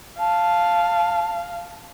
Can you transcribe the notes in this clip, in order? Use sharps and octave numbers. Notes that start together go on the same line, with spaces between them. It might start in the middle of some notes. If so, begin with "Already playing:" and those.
F5 A5